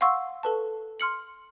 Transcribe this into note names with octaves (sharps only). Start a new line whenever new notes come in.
F5 F#5 C6 C#6 E6
A4 B4 A5
C6 F6 C#7 F#7